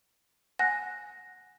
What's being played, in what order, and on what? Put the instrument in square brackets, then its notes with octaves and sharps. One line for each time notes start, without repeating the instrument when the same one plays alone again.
[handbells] F#5 G#5 F#6 [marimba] A#6